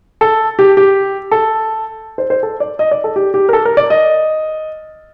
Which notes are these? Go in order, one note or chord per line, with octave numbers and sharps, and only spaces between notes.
A4
G4
G4
A4
C5
C5
A4
D5
D#5
D5
A4
G4
G4
A#4
A4
A#4
D5
D#5